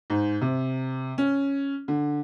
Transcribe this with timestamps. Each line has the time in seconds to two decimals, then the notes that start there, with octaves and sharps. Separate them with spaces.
0.10 G#2
0.41 C3
1.18 C#4
1.88 D3